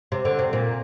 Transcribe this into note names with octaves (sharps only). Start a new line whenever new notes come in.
C3
D3
C3
A#2